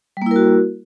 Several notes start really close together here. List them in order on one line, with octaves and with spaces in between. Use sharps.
G3 A#3 E4 A#4 F#4